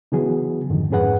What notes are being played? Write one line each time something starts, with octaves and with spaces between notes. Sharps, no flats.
C#3 E3 F#3 B3 F#4 G#4
F2 G#2 D3 D#3
F2 G#2 C#4 G#4 B4 F#5